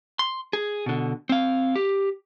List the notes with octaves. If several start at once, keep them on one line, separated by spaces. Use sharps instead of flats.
C6
G#4
B2 D3
C4 F5
G4